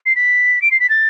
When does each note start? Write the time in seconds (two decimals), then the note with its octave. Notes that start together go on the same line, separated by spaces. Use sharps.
0.05 C7
0.15 B6
0.61 D7
0.71 C7
0.79 B6
0.89 A6